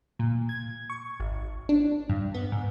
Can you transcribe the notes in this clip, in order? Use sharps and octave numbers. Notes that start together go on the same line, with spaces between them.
A#2
G#6
C#6
G#1
D4
G2
B3
G#2